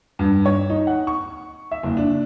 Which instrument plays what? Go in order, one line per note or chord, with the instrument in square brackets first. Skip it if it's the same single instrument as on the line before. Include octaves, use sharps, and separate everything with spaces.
[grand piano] G2
C#5
D#4
F#5
C#6
E5
F#1
D4